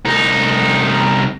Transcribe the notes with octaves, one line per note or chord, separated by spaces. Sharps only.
C2 D#4